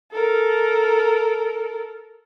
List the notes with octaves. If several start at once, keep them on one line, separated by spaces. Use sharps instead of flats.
A4 A#4